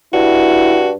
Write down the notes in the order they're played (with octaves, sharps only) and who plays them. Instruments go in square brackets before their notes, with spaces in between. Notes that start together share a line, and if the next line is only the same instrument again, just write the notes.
[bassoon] G2 [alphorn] E4 [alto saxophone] F#4